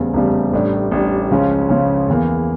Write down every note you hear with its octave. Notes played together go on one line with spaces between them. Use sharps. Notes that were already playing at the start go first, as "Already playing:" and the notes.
Already playing: F1 E2 C#3 G3
F1 E2 C#3 G3
A1 A2 G3 D4
A1 A2 G3 D4
C#2 C#3 F3 C#4
C#2 C#3 F3 C#4
E2 C#3 E3 A#3